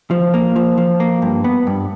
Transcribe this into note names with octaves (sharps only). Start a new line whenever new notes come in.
F3
A#3
F3
F3
A#3
G2
B3
G2